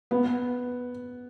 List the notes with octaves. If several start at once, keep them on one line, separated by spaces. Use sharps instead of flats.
B3